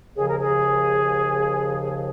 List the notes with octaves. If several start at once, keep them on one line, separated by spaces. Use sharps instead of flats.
D#2 C#3 F3 G#4
A#4
G#4